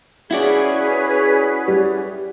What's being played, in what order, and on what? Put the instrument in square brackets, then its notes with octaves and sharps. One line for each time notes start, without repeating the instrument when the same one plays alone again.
[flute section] C#4 G#4 B4 [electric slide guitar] E4 F#4 D5
[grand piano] G3